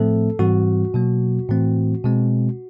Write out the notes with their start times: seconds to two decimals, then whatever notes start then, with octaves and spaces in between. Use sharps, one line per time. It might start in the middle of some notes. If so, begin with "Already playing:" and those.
Already playing: A2 F3 A3 C4 A4
0.39 G#2 E3 G3 C4 F#4
0.94 B2 F#3 A#3
1.49 A2 E3 A3 C4
2.04 B2 G#3 C4